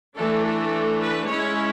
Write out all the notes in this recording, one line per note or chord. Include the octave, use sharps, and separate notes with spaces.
E3 A3 D4 A4
A4
B4
G#3 C#4 E4 C#5